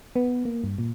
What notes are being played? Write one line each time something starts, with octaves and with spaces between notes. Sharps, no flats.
B3
A#3
G2
A#2